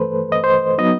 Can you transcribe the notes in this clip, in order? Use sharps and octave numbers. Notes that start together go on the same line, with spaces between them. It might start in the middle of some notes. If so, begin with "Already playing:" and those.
Already playing: G2 E3 A3 A4 B4 C5
D#5
C5
F#3 B3 D#4 D#5